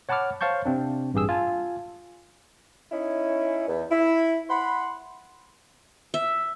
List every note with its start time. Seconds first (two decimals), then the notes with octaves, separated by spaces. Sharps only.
0.09 C#5 F#5 A5 B5 D6 F6
0.41 C5 C#5 F5 A5 C#6 G6
0.65 C3 C4 D4
1.13 A1 G2 G4 G#4 E6
1.29 F4 G#5 A5
2.92 C#4 D#4 E4
3.68 E2
3.91 E4
4.50 F#5 B5 C6
6.14 E5